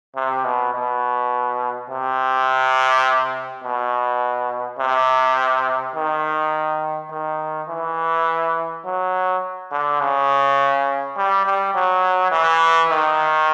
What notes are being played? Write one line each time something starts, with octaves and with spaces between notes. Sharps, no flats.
C3
B2
B2
C3
B2
C3
D#3
D#3
E3
F#3
D3
C#3
G3
G3
F#3
E3
D#3